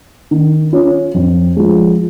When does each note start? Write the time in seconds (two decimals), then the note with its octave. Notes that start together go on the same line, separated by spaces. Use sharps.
0.31 D#3
0.73 C#4 F4
1.14 F2
1.57 F3 G#3